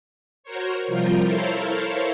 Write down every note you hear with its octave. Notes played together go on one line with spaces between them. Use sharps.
F#4 A#4 C5 C#5
C3 F3 G3 F4 A#4 G5
E4 A4 A#4 C5 C#5 F5